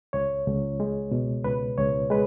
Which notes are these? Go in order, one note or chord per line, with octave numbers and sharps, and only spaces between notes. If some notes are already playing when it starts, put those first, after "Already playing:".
C#2 C#5
C#2
G#3
B2
C#2 B4
C#2 C#5
G#3 B4